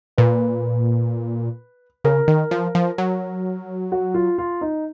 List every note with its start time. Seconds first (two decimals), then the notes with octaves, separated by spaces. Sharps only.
0.18 A#2 B4
2.04 C#3 A#4
2.28 D#3
2.51 F3
2.75 F3
2.98 F#3
3.92 F#4
4.14 F4
4.38 F4
4.61 D#4